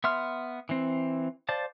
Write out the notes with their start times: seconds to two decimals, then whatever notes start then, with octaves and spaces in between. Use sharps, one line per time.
0.04 B3 E5 C6 F6
0.69 E3 C4
1.49 C5 D5 F5 A5